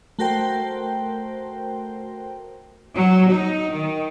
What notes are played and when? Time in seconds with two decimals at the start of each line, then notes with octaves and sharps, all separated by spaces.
0.19 A3 F#4 A#4 C5 G5
2.94 F#3
3.31 D#4
3.72 D#3